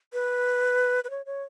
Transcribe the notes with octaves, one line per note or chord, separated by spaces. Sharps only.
B4
B4
C#5
C#5